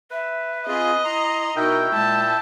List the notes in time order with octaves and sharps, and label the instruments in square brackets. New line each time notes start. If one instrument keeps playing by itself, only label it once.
[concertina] B4 [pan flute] E5
[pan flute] C4 [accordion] F4 G#4 [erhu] D#5
[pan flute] E4 [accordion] A#5 [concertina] C6
[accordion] B2 D#4 A#4 [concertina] E4 G5 [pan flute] F#4
[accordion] A#2 [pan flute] G#3 [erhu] A5